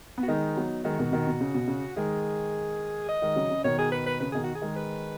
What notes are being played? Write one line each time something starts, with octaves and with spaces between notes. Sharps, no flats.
B3
F#4
D#3 G#3 D#4
F#3 B3
D#3 G#3 F#4
B2 D#3
B2 D#3
B2
C#3
B2
C#3
D#3 G#3 G#4
D#5
D#3 G#3
C#3 F#3
C#3
B2 D#3 C#5
G#4
B4
B4
C#3 B4
B2 D#3 G#4
F#4
G#4
D#3 G#3
B4